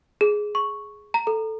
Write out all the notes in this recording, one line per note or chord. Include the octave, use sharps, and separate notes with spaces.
G#4
C#6
A#5
A4